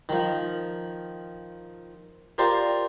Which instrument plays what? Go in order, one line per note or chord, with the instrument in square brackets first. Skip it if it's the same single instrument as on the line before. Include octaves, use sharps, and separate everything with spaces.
[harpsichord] D#3 F3
F4 G4 A#4 C5 D5 C6